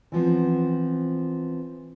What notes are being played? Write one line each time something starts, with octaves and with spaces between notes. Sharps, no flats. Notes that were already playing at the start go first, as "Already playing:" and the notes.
E3 F3 B3 C4